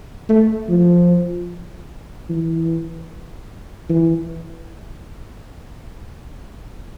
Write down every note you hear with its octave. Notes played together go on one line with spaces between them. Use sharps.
A3
F3
E3
E3